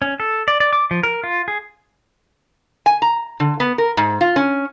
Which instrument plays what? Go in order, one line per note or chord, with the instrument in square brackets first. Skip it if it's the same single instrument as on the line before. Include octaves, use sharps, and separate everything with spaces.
[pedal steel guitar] C#4
A4
D5
D5
D6
F3
A#4
F4
G#4
[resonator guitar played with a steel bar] G#5
A#5
D3
B3
A#4
G#2
F4
C#4